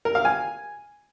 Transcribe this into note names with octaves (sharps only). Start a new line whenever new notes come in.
A#4
F5
G#5